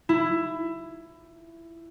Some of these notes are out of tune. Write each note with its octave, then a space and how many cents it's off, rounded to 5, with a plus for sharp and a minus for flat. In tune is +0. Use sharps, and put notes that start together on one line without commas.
E4 +15